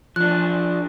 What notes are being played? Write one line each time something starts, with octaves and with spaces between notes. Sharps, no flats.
F3 D4 F#6